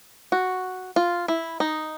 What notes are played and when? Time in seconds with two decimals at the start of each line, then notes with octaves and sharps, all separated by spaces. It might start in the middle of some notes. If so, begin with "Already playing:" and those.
0.32 F#4
0.96 F4
1.28 E4
1.60 D#4